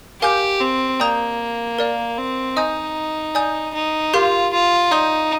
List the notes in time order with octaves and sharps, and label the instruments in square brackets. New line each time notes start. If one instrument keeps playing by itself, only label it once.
[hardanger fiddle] G4 [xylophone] A#4 F5 G#5 D6 G6
[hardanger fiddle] C4
[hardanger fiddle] A#3 [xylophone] D5 G5 A#5 D#6 G6
[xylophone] A#4 D5 F5
[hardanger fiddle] C4
[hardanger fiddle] D#4 [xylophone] D#5 G#5 D#6 G6
[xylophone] D5 G#5 D#6 G6
[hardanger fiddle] D#4
[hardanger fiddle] F4 [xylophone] G4 A#4 F5 C6 G6
[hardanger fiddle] F4
[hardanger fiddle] D#4 [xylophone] D5 F5 C6 D#6 G6